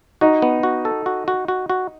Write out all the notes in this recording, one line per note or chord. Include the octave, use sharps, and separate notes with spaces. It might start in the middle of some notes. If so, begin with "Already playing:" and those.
D#4 F#4
B3
F#4
A4
F#4
F#4
F#4
F#4